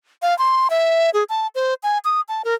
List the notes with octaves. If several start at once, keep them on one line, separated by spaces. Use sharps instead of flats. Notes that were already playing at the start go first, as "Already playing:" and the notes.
F5
C6
E5
G#4
A5
C5
G#5
D#6
A5
A#4